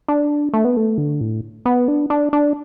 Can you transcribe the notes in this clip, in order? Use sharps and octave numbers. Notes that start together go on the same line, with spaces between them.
D4
A3
B3
A3
D3
A2
B3
D4
D4
D4